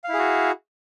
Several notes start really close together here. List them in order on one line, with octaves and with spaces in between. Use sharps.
F5 E4 G#4 F#4